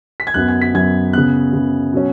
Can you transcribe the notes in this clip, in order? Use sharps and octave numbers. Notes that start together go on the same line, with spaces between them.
B6
G#6
F#2 F#3 B3 F#6
G#6
B6
F#2 F#3 B3 G#6
C#3 B3 F#6
C#3 B3
B2 F#3 C#4